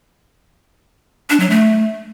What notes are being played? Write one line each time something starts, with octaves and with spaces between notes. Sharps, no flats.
D4
F#3
A3